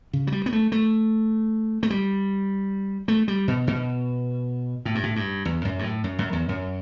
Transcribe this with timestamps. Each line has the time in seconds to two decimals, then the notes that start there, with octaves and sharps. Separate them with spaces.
0.13 C#3
0.27 F#3
0.32 G3
0.46 B3
0.52 A3
0.72 A3
1.83 A3
1.90 G3
3.08 A3
3.28 G3
3.48 B2
3.67 B2
4.85 A2
4.95 G2
5.03 A2
5.16 G2
5.45 E2
5.65 F#2
5.79 G2
5.84 A2
6.04 F#2
6.19 F#2
6.33 E2
6.49 F#2